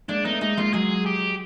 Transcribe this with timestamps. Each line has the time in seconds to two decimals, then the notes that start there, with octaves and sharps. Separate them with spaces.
0.08 G#3 A#3 D4
0.25 A3 B3 D#4
0.41 G#3 A#3 D#4
0.57 G#3 A#3 F4
0.73 F#3 G#3 G#4
1.06 G4